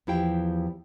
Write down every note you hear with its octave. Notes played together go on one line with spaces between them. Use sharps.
E2 F3 E4 G4 F5 G5